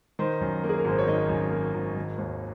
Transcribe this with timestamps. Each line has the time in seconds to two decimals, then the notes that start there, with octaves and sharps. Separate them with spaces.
0.19 D#3 C5
0.41 F#2
0.64 A#3
0.69 G#4
0.79 A#4
0.85 G#1 C5
0.99 C#5
1.07 D#3 D#5
1.29 F#2
1.52 A#3
1.75 G#1
1.97 D#3
2.18 D#2